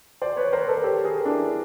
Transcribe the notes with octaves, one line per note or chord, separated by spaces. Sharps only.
C5 D5
B4 C#5
A#4 C5
A4 B4
G4 A4
G#4 A#4
D4 E4